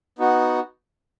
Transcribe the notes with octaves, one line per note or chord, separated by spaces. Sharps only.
B3 D#4 F#4